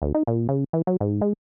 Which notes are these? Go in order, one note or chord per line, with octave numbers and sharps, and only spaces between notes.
D2
D#4
A#2
C#3
E3
F#3
G#2
G#3